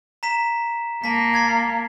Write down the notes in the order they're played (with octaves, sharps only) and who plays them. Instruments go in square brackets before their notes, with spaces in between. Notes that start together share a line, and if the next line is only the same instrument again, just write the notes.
[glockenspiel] A#5 B6 E7
[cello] A#3 [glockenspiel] A5 B6
[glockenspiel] G#6 A6 C7